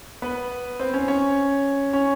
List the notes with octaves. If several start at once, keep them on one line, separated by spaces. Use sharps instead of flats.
B3 B4
C4 C5
C#4 C#5
C#4 C#5
C#4 C#5